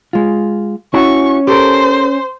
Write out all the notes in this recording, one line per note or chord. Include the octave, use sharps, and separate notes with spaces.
G#3 F4
C#4 E4 F#4 C#6
G4 A4 A#4 C5